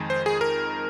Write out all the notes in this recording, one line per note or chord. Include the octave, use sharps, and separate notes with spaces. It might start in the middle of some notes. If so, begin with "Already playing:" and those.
Already playing: F2 D#3 G#3
C5
G#4
A#4